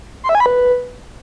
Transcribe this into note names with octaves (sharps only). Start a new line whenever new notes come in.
C6
E5
G#5
B5
B4